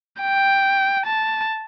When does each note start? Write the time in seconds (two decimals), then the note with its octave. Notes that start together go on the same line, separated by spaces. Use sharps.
0.21 G5
1.06 A5